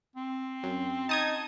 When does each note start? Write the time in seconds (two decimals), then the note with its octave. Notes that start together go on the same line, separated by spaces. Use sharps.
0.16 C4
0.63 F#2
1.09 D#4 A5 D#6 G#6